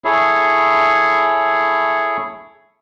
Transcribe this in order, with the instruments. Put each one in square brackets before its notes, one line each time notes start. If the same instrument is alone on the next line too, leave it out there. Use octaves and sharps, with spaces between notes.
[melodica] E4 G#4 A4 C#5